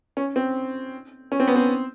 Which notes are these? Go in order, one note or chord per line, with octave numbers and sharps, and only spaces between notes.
C#4
C4
C#4
C4
B3
C4